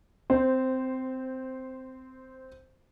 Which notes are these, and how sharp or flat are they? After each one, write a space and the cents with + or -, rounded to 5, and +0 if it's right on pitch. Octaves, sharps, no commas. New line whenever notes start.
C4 -15 C5 +0